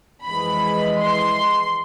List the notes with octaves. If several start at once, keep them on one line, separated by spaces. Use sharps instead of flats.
F2 E3 G#3 B5
C6